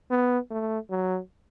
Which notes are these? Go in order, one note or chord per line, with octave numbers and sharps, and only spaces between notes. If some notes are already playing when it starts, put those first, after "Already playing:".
B3
A3
F#3